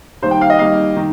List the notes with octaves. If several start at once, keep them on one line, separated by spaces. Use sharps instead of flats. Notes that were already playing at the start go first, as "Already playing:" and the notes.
D#3 G3 A#3 C5
G5
F5
D#5
D#3 G3 A#3 F5
D#3